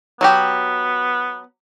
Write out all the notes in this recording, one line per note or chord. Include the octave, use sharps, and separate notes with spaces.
F#3 B3 F#4 G4